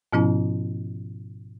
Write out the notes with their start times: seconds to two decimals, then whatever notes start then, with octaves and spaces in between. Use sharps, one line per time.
0.12 G#2 B2 F3 B3 C#4 E4